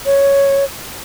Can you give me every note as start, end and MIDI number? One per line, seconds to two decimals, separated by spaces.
0.06 0.64 73